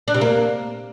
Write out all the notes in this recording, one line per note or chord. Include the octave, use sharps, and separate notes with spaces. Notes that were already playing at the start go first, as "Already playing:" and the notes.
D4
C3
A#3